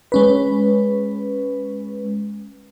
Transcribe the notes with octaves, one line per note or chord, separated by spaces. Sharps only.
G#3 C#4 B4